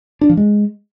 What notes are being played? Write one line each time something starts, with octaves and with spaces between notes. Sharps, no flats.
D4
F3
G#3